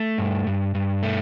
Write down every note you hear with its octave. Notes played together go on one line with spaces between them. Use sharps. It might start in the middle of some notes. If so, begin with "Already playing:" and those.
Already playing: A3
G2
G2
G2
A3